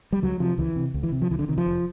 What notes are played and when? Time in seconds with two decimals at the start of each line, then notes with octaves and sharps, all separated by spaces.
0.13 G3
0.22 C#2 F#3
0.40 C3 F3
0.58 C#2 E3
0.76 C3
0.94 C#2
1.03 E3
1.12 C3
1.22 F3
1.30 C#2 E3
1.39 D3
1.48 C3 D#3
1.58 F3
1.66 F1